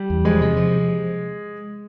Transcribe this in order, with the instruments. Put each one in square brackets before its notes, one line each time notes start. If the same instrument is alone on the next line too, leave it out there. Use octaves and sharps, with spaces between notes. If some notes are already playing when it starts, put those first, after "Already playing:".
Already playing: [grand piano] G3
[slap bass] E2
[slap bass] F3 [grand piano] G#3
[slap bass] C3
F3